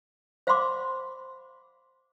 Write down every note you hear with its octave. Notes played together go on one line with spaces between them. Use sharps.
C5 F5 F#5 B5 C6 D6